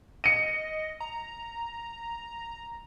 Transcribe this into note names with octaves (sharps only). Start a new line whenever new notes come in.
D#5 C#7 D#7
A#5